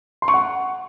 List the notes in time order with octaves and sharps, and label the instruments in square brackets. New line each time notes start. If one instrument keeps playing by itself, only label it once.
[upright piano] C6
C#6
F#5